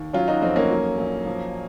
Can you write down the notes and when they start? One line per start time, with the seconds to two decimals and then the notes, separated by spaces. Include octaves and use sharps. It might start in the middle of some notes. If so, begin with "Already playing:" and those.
Already playing: D#2
0.13 F#3 C#4 F4
0.28 D#4 F#4
0.41 F2 C4 D#4
0.56 A#3 C#4
0.70 F#3
0.98 A#1
1.26 F3